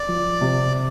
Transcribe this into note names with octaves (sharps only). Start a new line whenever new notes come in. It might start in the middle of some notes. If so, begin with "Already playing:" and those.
Already playing: D5
F3
C3